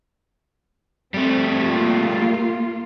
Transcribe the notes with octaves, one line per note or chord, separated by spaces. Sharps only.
G3 A3 C4
A#3 F4